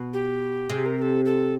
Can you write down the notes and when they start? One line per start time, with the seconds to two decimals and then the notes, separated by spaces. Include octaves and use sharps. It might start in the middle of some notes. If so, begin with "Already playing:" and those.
Already playing: B2
0.13 G4
0.69 C3 G#4
0.86 A#4
0.98 A#4
1.02 A4
1.25 A4